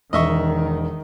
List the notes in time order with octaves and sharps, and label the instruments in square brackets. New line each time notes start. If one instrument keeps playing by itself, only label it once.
[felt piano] E1 [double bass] D#3 [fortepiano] D#5 E5 C#6